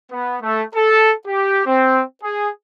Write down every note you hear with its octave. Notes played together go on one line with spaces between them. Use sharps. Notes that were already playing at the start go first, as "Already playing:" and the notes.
B3
A3
A4
G4
C4
G#4